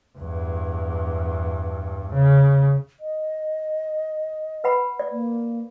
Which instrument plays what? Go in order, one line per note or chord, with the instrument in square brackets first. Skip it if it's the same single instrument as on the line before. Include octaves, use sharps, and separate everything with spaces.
[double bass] E2 G2
C#3
[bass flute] D#5
[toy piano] B4 F#5 B5
D5
[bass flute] A#3